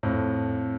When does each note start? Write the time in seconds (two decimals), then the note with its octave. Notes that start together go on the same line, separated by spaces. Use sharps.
0.03 F2 A2